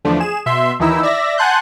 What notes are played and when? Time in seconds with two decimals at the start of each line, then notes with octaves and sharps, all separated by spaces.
0.05 E2 D3 F3 A3 D4
0.20 G#4 E7
0.46 B2 E5 C6
0.79 D#2 D#3 E3 D#4 E4 E6
1.03 D5 E5 A#6
1.38 F#5 G#5 A5 C6 F#6 G6